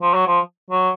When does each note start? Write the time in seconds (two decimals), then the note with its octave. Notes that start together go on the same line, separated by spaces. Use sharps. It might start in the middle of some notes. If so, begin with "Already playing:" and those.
0.02 F3
0.14 F#3
0.27 F3
0.70 F#3